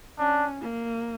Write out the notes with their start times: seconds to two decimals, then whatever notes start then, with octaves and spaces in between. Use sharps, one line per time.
0.19 C#4 D4
0.62 A#3